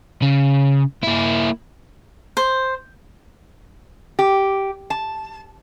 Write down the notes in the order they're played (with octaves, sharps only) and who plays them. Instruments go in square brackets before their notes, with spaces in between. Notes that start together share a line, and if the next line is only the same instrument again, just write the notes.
[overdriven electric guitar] C#3
A#3 E4
[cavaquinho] C5
[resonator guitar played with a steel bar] G4
A5